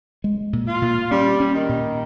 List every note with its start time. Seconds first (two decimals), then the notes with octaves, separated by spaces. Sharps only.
0.24 G#3
0.53 A#2
0.67 F4
0.82 A#2
1.11 G3 C#4
1.40 C#4
1.54 D#3
1.69 A#2